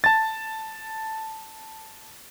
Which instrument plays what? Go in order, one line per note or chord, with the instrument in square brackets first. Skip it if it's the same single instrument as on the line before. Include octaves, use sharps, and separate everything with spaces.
[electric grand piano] A5 A6